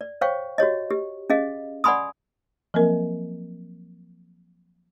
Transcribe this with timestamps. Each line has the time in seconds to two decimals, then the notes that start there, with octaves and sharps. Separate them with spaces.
0.01 D5
0.21 C5 C#5 F5 G5 C#6
0.58 F#4 G4 C#5 D#5
0.91 G4
1.30 C#4 G#4 D#5 F5
1.84 D5 F#5 G#5 B5 C6 D#6
2.74 F3 F#3 A#3 C4 A#4